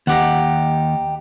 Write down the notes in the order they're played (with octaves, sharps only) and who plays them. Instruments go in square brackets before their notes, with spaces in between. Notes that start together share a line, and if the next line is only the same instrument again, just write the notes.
[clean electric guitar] D#2 [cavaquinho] D#4 G4 F#5